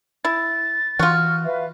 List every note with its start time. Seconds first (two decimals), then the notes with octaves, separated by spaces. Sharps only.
0.25 E4 A6
0.99 E3 F4 F#4 F6
1.44 B4 E5 F5